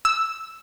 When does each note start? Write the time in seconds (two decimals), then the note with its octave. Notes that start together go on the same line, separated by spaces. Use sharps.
0.05 E6